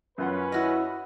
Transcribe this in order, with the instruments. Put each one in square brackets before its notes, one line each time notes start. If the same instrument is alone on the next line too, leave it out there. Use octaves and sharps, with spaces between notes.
[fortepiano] F#2 F4 F#5 [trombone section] C#4 B4
[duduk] E4 [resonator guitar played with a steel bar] F#4 D#5